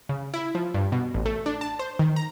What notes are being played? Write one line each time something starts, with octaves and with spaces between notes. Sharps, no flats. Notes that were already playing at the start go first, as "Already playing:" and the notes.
C#3
E4
F3
G2
B2
A1
A3
D4
A5
C5
D#3
A#5